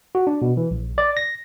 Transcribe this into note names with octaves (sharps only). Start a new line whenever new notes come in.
F#4
D4
B2
E3
A#1
D5
A#6